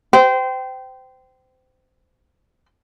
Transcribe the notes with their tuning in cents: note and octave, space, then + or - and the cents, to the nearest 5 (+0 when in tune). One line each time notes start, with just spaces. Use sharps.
C5 -25 G5 -20